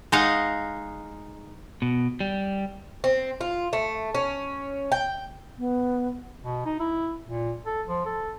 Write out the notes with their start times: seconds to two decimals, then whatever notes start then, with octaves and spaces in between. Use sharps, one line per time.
0.12 G#3 D#4 D#5 F5 F#5
1.82 B2
2.20 G3
3.04 C4
3.41 F4
3.73 A3
4.15 C#4
4.92 G5
5.58 B3
6.43 B2
6.66 D#4
6.80 E4
7.29 A#2
7.66 A4
7.87 F3
8.06 A4